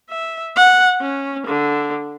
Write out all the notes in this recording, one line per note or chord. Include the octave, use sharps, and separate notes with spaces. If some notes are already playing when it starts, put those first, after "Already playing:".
E5
F#5
C#4
D3